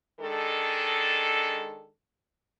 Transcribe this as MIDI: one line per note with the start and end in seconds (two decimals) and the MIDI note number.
0.21 1.90 51
0.21 1.90 56
0.21 1.90 62
0.21 1.90 69